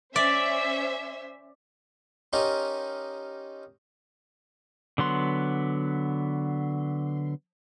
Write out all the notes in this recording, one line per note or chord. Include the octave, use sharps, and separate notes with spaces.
C#4 C5 D5 E5
C#4 D#4 F4 G4 A#4
D3 F#3 B3 C6